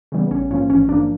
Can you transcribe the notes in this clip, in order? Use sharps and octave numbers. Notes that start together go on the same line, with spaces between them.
C#3 E3 G3 B3
A1 C#4
G#2 F3 A#3 C#4
A1 C#4
G#2 F3 A#3 D4